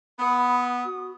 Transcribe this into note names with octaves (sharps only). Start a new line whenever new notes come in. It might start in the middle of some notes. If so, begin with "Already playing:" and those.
B3 B5 D#6
F#4